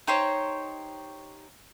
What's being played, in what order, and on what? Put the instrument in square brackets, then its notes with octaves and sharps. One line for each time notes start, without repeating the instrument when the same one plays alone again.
[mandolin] D#4 G4 C5 C#5